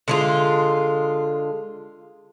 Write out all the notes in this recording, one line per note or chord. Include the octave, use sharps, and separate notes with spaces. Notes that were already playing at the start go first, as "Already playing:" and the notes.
D3 G#3 F4